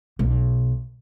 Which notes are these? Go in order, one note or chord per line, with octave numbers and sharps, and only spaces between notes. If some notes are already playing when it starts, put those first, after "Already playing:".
B1